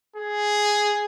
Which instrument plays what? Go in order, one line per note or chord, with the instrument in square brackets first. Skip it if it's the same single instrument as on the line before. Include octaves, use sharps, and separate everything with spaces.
[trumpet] G#4